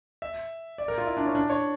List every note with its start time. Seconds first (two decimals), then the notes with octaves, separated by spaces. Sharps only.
0.22 E5
0.78 D5
0.88 A#4
0.98 F4
1.07 E4
1.17 D4
1.26 C#4
1.35 D4
1.50 C#5